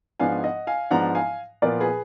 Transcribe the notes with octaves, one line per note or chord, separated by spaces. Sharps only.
G#2 F3 B3 D4 F5 G#5
D#5 F#5
F5 G#5
G#2 F3 B3 D4 F#5 A#5
F5 G#5
A#2 F3 B3 F4 A#4 D5
G#4 B4